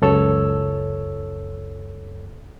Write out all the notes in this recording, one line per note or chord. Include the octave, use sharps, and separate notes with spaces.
C#2 F#2 A4 C#5 E6